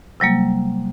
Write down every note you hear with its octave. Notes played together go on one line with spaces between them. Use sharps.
C3 F#3 G3 A#3